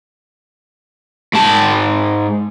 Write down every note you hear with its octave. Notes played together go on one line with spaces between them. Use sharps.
G#2 A5